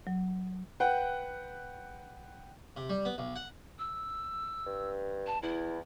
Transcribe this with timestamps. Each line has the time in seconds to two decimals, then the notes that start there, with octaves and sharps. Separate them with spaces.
0.07 F#3
0.80 B4 F#5 G5
2.77 C3
2.89 G3
3.05 B3
3.18 B1
3.36 F#5
3.78 E6
4.66 G2
5.26 A5
5.42 E2 E4